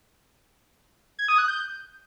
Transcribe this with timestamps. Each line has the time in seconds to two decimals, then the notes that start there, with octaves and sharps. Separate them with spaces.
1.19 G#6
1.28 D#6
1.38 F#6
1.48 G6